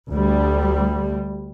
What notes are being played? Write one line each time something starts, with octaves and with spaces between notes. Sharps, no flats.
D2 G3